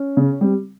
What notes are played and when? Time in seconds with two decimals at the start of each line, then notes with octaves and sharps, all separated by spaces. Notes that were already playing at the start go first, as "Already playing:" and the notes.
Already playing: C#4
0.17 C#3
0.41 G3 C4